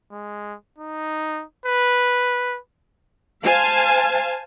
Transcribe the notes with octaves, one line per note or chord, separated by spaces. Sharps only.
G#3
D#4
B4
C5 F5 G#5 A5